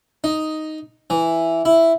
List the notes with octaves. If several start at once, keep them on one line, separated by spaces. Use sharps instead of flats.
D#4
E3
E4